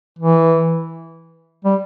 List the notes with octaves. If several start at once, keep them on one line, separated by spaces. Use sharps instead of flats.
E3
G3